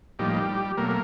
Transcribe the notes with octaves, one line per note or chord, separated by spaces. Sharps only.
A2 F3 G3 A#3 D#4 G4
B2 F#3 A3 A#3 A#4